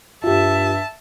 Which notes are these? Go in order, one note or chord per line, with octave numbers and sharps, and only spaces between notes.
G2 F4 G4 E5 A5